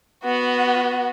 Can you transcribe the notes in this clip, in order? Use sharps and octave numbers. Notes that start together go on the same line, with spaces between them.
B3 F#4